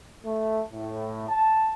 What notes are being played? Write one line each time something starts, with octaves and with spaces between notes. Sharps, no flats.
A3
A2
A5